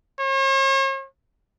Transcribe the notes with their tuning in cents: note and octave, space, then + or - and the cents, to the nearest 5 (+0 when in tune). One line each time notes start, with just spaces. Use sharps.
C#5 -45